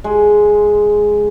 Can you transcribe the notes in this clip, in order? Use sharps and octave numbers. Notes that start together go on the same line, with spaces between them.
G#3